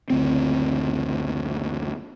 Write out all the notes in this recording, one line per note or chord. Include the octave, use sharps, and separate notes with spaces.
F#1 D2 C4